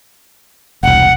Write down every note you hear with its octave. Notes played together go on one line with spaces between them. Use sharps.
E1 C2 F#5